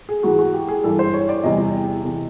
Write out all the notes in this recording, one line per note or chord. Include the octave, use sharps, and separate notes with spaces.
G#4
G#2 E3 G#3 F#4
F#4
G4
G#4
G2 E3 G3 A4
C5
C#5
D5
E2 C3 E3 G3 D#5
C3 E3